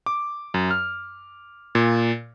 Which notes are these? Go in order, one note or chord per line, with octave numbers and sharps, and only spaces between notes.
D6
F#2
F6
A#2